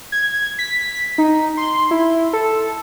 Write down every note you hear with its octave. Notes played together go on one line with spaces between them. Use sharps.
G#6
B6
D#4
C6
E4
A4